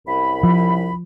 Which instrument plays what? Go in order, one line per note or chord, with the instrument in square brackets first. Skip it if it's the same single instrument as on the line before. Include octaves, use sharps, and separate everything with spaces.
[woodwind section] C2 F#2 B5
[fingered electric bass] F3